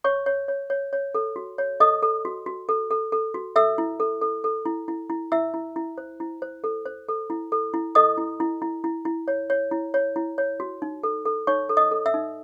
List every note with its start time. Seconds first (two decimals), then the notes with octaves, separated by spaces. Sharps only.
0.04 C#5 C#6
0.26 C#5
0.48 C#5
0.70 C#5
0.93 C#5
1.15 A4
1.36 F#4
1.58 C#5
1.80 A4 D#5 D#6
2.02 A4
2.25 F#4
2.46 F#4
2.69 A4
2.91 A4
3.12 A4
3.34 F#4
3.56 A4 E5 E6
3.78 E4
4.00 A4
4.22 A4
4.44 A4
4.66 E4
4.88 E4
5.10 E4
5.32 E4 E5 E6
5.54 E4
5.76 E4
5.98 C5
6.20 E4
6.42 C5
6.64 A4
6.86 C5
7.08 A4
7.30 E4
7.52 A4
7.74 E4
7.95 A4 D#5 D#6
8.18 E4
8.40 E4
8.62 E4
8.84 E4
9.05 E4
9.28 C#5
9.50 C#5
9.71 E4
9.94 C#5
10.16 E4
10.38 C#5
10.60 F#4
10.82 D#4
11.03 A4
11.25 A4
11.47 D#4 C#5 C#6
11.69 A4
11.77 D#5 D#6
11.91 A4
12.06 E5 E6
12.14 D#4